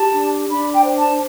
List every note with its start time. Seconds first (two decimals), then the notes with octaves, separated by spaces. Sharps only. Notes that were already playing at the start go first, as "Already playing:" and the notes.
Already playing: G4 A5
0.14 D4
0.49 D4 B5
0.72 G5
0.84 C5
0.97 A5